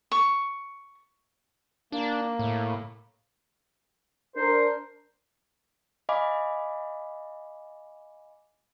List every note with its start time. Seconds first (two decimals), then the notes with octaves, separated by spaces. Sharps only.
0.12 C#6
1.92 A#3 D4
2.39 A2
4.36 D4 A#4 C5
6.09 D#5 F5 G#5 B5 D6